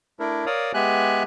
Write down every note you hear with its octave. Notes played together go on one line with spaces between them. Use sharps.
A3 D4 E4 A#4
A#4 C#5 D5 F5 D#6
G#3 B3 G4 E5 G#5 F#6